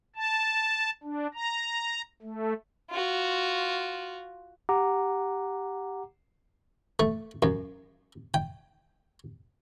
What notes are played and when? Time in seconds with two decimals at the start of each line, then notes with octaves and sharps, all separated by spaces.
0.16 A5
1.03 D4
1.34 A#5
2.22 A3
2.90 F4 F#4
4.69 G4 F#5 A#5 D6
7.00 A3
7.43 F#2
8.34 G5